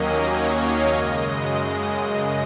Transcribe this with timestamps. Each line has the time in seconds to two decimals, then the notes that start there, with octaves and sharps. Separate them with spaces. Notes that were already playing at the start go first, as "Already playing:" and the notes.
Already playing: D#2 D#3 F#3 A#3 C#4 D#5
0.18 C#5
0.53 F5
0.87 F#2 C#3 G#3 D#5